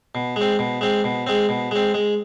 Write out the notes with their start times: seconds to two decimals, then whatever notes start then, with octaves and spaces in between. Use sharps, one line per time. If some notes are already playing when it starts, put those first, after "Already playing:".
0.15 B2
0.36 G#3 C4
0.59 B2
0.81 G#3 C4
1.04 B2
1.27 G#3 C4
1.49 B2
1.71 G#3 C4
1.94 G#3